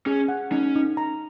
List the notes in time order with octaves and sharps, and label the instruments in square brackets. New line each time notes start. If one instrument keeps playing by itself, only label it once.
[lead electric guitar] C#4 [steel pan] G#4
[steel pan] F#5
[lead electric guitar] C#4 [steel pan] D#4
[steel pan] D#4
A#5